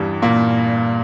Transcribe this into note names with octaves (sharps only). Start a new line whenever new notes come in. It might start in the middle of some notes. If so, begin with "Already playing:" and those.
Already playing: E2 G2 E3 G3
A#2 A#3